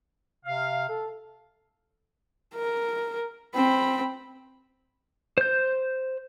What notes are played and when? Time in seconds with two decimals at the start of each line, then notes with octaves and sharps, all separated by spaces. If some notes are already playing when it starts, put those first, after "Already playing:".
0.45 C3 F5
0.89 A4
2.55 A#4
3.55 C4 B5
5.38 C5 G6